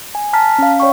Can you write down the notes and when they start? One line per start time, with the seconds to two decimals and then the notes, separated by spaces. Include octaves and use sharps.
0.15 G#5
0.33 A5 A#5 F6 B6
0.59 C#4 F5
0.80 C#5 D5 G5 C#6